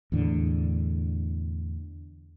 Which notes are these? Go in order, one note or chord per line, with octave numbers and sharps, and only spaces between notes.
E2 A2 D3